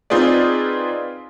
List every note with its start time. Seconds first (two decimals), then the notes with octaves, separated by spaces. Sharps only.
0.10 C4 D#4 F4 G#4 B4 D5